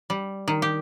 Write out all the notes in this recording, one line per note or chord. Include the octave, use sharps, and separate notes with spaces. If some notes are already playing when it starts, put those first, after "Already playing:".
G3
D#3
G4